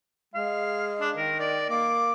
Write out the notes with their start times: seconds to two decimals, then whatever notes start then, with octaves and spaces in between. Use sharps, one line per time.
0.34 G#3 F5
1.01 D4
1.16 D#3 A#4
1.39 D5
1.70 A#3 D6